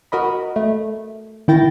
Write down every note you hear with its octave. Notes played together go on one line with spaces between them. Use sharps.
F#4 A#4 D#5 B5
A3
D#3 E4 G5 A6 A#6